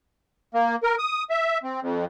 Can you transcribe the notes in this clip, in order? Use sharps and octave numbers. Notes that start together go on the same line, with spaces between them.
A#3
A#4
D#6
E5
C4
F2